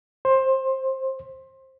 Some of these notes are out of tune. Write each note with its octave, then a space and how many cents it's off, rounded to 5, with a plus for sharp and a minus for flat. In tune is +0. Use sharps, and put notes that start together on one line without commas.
C5 +20